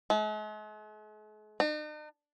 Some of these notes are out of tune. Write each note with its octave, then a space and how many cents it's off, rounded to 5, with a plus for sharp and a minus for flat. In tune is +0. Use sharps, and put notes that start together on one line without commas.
G#3 +45
D#4 -45